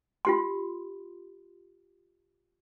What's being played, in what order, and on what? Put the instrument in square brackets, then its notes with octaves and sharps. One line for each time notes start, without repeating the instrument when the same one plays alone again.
[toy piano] F4 G4 C6